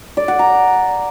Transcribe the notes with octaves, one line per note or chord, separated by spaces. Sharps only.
D5
F#5
A#5